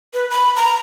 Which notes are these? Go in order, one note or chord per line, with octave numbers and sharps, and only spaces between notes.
B4
B5
A#5